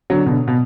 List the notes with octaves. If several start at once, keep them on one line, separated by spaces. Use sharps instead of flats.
D3 F#3
B2 D3
B2